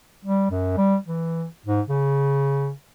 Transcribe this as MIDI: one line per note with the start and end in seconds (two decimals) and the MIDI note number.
0.25 0.46 55
0.51 0.74 42
0.77 0.96 55
1.05 1.46 52
1.66 1.81 44
1.89 2.71 49